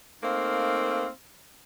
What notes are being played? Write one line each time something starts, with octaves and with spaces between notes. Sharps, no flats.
A3 A#3 C4 D#4 F5